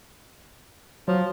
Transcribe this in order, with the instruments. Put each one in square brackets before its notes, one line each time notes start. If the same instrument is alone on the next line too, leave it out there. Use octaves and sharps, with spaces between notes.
[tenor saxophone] F3 [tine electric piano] F#3